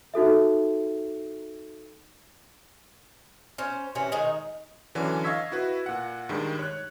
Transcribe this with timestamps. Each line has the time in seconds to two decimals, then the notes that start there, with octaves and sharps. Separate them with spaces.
0.14 D#4 F#4 A4 E5
3.58 C#4 C5
3.95 C3 E3 C#4
4.12 D#3 G#3 D#4 G#4
4.95 D3 E3 F#3 C#4 D4
5.24 D#5 F5 C#6 E6 G#6 B6
5.52 E4 F#4 B4
5.86 A#2 F#5
6.29 G2 D#3 G3 G#3
6.59 C#5 F#6